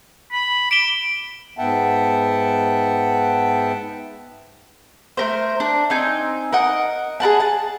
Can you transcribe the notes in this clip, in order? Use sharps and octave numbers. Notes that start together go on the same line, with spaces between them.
B5
D6 D7 E7 G7
G#2 B3 E5 F#5 G5 A5
A3 A#4 C5
D4
C4 D#4 G#5
A#4 D#5 F#5
G#4 A#4 F#5 A5
A5